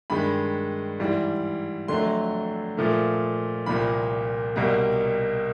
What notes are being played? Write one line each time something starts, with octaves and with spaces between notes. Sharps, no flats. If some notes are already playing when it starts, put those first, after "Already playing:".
G2 D#3 G#3 B5
G#2 E3 G3
F2 D3 F#3 A3 C6
A#2 F3 A3
C2 A#2 F3 A#3 B5
C2 B2 G3 A#3